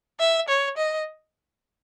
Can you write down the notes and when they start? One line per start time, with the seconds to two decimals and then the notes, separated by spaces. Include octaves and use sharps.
0.20 E5
0.48 C#5
0.77 D#5